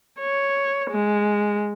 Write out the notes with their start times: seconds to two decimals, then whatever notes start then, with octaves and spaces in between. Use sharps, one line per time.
0.20 C#5
0.90 G#3